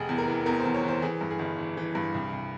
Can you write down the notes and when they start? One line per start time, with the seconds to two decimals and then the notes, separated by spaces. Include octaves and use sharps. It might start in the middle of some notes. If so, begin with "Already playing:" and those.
Already playing: F1 G#4
0.09 E2
0.18 A#4
0.28 E3
0.46 E2 A#4
0.60 C5
0.65 E2
0.74 C#5
0.84 E3 C5
1.02 E3 G#4
1.21 G2
1.31 G#4
1.39 G1
1.59 E3
1.77 E3
1.95 G2
2.14 C2
2.33 C2